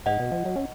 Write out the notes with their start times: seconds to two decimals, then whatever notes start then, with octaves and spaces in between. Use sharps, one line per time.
0.06 G#2 D#5 F#5
0.19 B2
0.32 F3
0.45 F#3
0.56 C#4